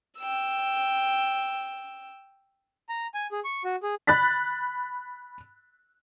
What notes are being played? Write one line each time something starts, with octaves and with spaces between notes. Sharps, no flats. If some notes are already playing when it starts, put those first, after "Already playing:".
G5 E6
A#5
G#5
G#4
C#6
F#4
G#4
B5 F#6 A6 B6